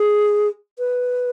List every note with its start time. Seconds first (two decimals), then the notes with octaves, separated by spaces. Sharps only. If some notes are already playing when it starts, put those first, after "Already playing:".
Already playing: G#4
0.79 B4